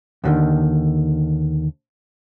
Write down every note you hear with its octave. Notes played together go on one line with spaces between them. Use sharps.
D#2 D3 D#3